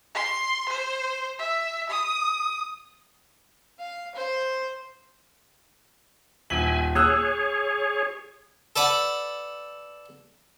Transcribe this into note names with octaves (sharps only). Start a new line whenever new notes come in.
C6
C5
E5
D#6
F5
C5
D#1 E5 G#5 F#7
G#4 C#5 D#6 E6 F#6
A4 B4 D5 F#5